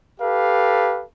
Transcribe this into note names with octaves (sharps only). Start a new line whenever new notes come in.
G4 A4 B4 F5